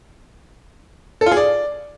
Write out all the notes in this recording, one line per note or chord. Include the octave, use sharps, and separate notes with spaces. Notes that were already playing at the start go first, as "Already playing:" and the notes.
A4
F4
G#4
D5